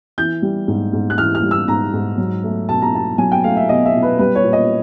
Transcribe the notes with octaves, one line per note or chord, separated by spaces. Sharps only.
E3 G6
G3
G#2
G#2
F#6
E3 F6
F6
G3
E6
G#2 A#5
G#2
F#3
A3
B2 A5
A#5
B2 A5
F#3 G#5
G5
A3 F5
E5
B2 D#5
E5
B2
B4
G3 B4
C#5
A#2
D#5